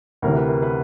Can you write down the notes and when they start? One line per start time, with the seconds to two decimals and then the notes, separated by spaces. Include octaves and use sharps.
0.22 D2 C3 E3 A#4
0.36 B4
0.49 A#4
0.62 B4